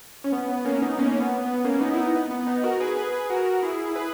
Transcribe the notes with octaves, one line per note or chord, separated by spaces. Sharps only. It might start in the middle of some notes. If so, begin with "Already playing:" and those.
C#4
B3
B3
A#3 C#4
B3 D#4
A#3 C#4
B3
B3
A#3 C#4
B3 D#4
E4
B3 D#4
B3
B3
B3 D#4
F#4 A#4
G#4 B4
G#4 B4
F#4 A#4
E4 G#4
G#4 B4